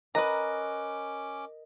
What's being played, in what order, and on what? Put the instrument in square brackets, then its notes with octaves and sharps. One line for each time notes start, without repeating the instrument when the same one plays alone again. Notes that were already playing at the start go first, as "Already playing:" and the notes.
[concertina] C#4 D6 [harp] A#4 D#5 F#6 [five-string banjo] B4 A#5